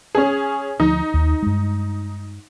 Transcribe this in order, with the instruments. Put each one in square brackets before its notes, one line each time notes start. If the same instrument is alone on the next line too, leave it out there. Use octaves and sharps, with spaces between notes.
[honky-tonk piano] C#4 G#4
[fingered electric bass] D2 F3 [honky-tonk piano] D#4
[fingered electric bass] D#2
G2 G#3